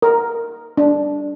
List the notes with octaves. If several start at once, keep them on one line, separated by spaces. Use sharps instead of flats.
A#4
D4